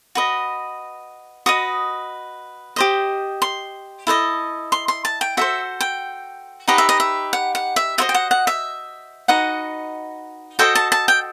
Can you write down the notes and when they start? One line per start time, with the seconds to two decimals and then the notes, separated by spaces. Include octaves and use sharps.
0.15 F#4 B4 D#5
1.46 F#4 B4 D#5 D#6
2.76 G4 C5 D#5
3.42 C6
4.07 E4 A4 C5 D#5
4.72 C6
4.88 C6
5.05 A5
5.21 G5
5.37 F#4 A4 C5 E5
5.81 G5
6.68 D#4 G4 B4 D#5 F#5
6.78 E5
6.89 D#5
7.00 E5
7.33 F#5
7.55 F#5
7.76 E5
7.98 F#4 C5 D#5 E5
8.09 G5
8.14 F#5
8.31 F#5
8.47 E5
9.28 D#4 F#4 B4 D#5 F#5
10.59 F#4 A4 C5 D#5 G5
10.75 A5
10.92 A5
11.08 G5